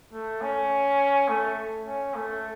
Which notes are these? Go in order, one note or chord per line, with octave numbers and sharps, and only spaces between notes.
A3
C#4
A3
C#4
A3